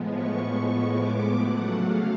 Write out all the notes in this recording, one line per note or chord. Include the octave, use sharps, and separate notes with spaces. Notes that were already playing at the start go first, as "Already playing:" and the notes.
Already playing: A2 F3 G#3 B3
C#6
D6
C#3 F#3 A3 F#5
F5